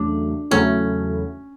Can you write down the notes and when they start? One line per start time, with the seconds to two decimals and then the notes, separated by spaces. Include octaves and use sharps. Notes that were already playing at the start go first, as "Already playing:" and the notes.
Already playing: E2 C#3 F#3 A3 D4
0.51 E2 C#3 F#3 A3 C#4 E4